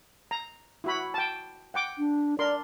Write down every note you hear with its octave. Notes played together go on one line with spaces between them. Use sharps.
A#5
E4 F#4 B5
G5 A5
F#5 G5 D6
D4
D4 A#4 D5 C6